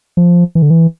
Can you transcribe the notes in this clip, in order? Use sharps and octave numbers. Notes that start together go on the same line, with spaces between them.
F3
E3
D3
E3